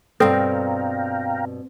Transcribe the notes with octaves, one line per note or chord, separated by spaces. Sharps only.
G2 B2 C4 A4 F5 G5 A#5